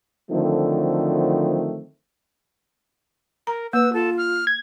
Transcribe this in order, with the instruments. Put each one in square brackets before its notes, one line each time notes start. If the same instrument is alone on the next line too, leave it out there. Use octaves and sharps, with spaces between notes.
[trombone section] D3 D#3 F3 F#3 A3 C4
[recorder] A#4 [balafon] A#5
[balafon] A#3 [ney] B4 [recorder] E6
[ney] F4 [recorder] A4
[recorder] F6
[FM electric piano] G#6